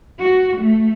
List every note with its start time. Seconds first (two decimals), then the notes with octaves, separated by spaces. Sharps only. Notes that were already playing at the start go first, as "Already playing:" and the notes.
0.21 F#4
0.60 A3